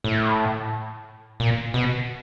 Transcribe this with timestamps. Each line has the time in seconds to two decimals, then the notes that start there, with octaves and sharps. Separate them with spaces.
0.04 A2
1.40 A#2
1.74 B2